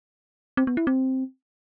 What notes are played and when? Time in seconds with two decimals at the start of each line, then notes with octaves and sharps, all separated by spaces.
0.57 C4
0.67 B3
0.77 E4
0.87 C4